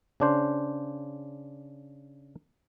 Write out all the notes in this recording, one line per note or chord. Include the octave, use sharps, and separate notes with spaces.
C#3 D4 C5